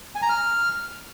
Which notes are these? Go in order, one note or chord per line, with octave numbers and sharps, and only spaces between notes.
G#5
A#5
F6